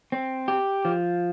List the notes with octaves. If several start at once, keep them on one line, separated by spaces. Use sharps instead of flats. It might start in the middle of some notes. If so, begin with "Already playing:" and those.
C4
G4
F3